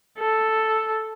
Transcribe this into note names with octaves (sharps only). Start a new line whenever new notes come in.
A4